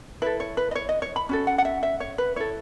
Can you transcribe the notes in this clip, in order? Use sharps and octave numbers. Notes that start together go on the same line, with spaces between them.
E4 A4 B4
C#5
B4
D#5
C#5
D#5
C#5
B5
C#4 F#4 A4
F#5
F#5
E5
E5
C#5
B4
E4 A4 C#5